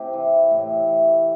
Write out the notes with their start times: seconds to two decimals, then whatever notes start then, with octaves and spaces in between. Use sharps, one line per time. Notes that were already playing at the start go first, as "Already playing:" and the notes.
Already playing: A2 C3 G4 A4
0.13 E3
0.51 A2
0.87 E3